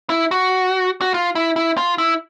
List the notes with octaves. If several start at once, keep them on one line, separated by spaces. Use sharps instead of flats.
E4
F#4
F#4
F4
E4
E4
F4
E4